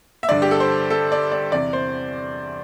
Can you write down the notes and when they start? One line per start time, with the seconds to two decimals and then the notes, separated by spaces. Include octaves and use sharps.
0.23 E5
0.29 G2 D3 D5
0.42 G4
0.51 A4
0.60 C5
0.90 A4
1.12 D5
1.32 D5
1.52 E2 C3 E3 D5
1.73 C5